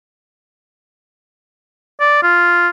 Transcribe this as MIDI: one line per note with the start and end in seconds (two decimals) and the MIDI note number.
2.00 2.20 74
2.23 2.68 65